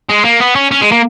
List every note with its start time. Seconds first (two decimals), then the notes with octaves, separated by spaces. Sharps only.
0.09 G#3
0.24 A#3
0.40 B3
0.55 C#4
0.71 C#4
0.81 G#3
0.92 A#3